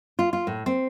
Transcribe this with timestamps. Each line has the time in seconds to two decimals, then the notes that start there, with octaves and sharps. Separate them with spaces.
0.19 F4
0.33 F4
0.47 A2
0.66 C4